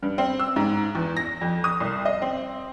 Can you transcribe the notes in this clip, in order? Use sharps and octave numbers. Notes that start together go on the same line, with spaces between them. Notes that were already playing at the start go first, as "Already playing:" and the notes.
G2
C4
E6
G#2
E2
A#6
F2
D#6
C2
D#5
C4